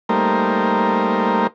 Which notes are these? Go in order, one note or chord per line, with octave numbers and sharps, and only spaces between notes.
G3 A3 A#3 D#4 A#4 C5